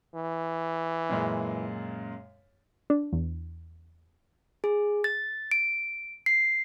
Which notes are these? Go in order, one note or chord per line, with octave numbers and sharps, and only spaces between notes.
E3
F#2 A#2 G#3
D4
E2
G#4
A6
D7
C7